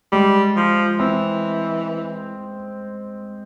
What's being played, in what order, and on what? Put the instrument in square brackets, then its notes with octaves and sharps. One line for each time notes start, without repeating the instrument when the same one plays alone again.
[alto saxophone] G3 [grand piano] G#3
[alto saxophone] F3
[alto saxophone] E3 [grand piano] C4